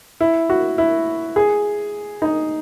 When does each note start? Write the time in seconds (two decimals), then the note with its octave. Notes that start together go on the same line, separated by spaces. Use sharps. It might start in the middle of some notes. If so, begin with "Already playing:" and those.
0.21 E4
0.50 F#4
0.78 E4
1.36 G#4
2.22 D#4